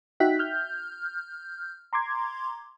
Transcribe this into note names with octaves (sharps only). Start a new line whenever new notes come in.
D#4 F#4 E5 G5 F#6 B6
F6 G6
A#5 C6 D6 G#6